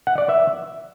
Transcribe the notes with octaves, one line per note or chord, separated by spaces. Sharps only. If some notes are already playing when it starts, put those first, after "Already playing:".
F#5
D5
E5